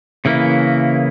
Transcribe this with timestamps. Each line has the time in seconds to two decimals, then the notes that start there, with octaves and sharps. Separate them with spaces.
0.25 C#3 E3 A#3 E4